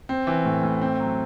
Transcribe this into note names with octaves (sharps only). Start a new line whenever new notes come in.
C4
E3
A2
A2
C4
F#3